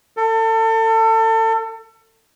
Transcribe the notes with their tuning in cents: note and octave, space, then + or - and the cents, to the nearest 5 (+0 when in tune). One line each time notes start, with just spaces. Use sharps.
A4 +30